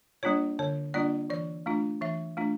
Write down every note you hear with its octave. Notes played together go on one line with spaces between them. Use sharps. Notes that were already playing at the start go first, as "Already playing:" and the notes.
G3 A#3 D4 F4 C#5
D3 C#5
G3 A#3 D4 F4 D5
E3 D5
A3 D4 F4
E3 E5
A3 D4 F4